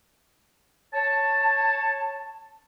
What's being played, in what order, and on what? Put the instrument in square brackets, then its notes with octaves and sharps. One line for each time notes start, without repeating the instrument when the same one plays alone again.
[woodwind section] C#5 A5